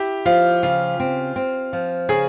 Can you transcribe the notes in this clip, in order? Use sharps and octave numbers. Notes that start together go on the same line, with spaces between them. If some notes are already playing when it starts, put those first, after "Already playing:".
Already playing: E4 G4
F3 F4
C#3 F4
C4
C4
F3
C#3 G#4